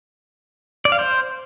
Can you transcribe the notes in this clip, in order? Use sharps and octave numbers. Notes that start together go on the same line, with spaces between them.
D5
F5
C5